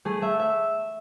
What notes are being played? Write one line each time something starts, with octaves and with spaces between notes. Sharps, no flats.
A3 G#4
A3 E5
E5